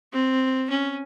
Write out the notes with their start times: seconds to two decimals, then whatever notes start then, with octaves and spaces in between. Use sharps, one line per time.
0.13 C4
0.70 C#4